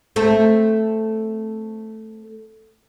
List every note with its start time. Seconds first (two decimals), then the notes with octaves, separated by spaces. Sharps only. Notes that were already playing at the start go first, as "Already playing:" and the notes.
0.16 A3 C4 A4